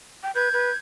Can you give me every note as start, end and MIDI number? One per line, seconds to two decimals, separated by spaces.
0.23 0.31 79
0.35 0.49 71
0.35 0.76 91
0.35 0.76 92
0.53 0.70 71